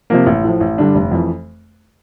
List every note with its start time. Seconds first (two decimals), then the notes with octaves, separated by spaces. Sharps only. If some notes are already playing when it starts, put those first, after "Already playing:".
0.10 C3 F3 A#3
0.26 A1
0.44 A2 F3
0.60 A1
0.78 G2 D3 G3 D4
0.95 F1
1.11 F2 E3